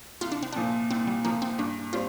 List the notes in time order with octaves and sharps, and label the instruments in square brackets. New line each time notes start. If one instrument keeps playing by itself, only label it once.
[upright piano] C2 [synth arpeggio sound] F4
[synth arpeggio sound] D4
C4
[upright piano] A#2 F3 [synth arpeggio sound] D4
[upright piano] C2 [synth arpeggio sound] C4
[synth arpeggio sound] G3
[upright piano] A#2 F3 [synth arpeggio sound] A#3
[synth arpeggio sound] C4
[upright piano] G2 [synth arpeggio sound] D4
[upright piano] G3 C4 [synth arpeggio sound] F4